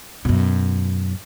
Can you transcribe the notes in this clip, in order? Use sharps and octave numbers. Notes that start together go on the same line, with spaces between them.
F#2 B2